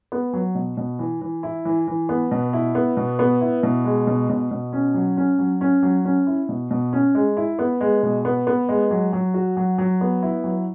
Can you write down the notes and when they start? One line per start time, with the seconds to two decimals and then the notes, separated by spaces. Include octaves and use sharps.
0.12 B3
0.33 F#3
0.55 B2
0.77 B2
0.99 E3
1.21 E3
1.43 E4
1.65 E3
1.88 E3
2.09 B3
2.31 B2
2.53 E4
2.75 B3
2.97 B2
3.19 B3
3.41 E4
3.63 B2
3.85 G#3
4.07 B2
4.29 B2
4.51 B2
4.73 C#4
4.94 F#3
5.17 C#4
5.39 F#3
5.61 C#4
5.83 F#3
6.05 C#4
6.27 E4
6.49 B2
6.71 B2
6.93 C#4
7.15 G#3
7.37 E4
7.59 B3
7.81 G#3
8.03 B2
8.25 B3
8.47 B3
8.69 G#3
8.91 F#3
9.13 F#3
9.34 F#4
9.57 F#3
9.78 F#3
10.01 B3
10.23 E4
10.44 F#3